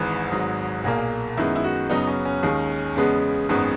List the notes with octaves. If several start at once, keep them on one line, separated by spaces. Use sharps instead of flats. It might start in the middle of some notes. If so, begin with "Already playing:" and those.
Already playing: G#1 G#2 E3 B4
G#1 G#2 F#3
B1 A#2 A#3 G#4
F#2 D#3 G#3 B3 E4
E4
F#4
F#2 C#3 F#3 B3 D#4
C#4
C#4
D#2 D#3 G#3
E2 C#3 G#3 B3
G#1 F#2 D#3 G#3 B3